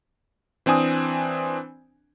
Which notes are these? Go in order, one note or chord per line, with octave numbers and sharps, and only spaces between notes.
E3 C4 D4 G#5 D#6